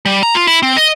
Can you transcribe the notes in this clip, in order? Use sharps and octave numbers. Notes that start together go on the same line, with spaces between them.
G3
A#5
F4
E4
C4
D#5